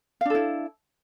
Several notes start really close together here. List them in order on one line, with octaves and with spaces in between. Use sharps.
F5 D4 A4 E4